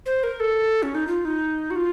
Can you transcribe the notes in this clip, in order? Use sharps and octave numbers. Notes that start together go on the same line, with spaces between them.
C5
A#4
A4
C#4
D#4
F4
D#4
F#4
F4